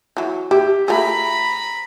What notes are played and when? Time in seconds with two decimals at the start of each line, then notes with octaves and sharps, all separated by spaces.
0.17 E3 F#3
0.51 E4 G4
0.88 A3 F4 G#4 A#5 B5